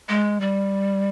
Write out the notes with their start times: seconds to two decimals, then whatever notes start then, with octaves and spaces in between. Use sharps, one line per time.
0.09 G#3
0.41 G3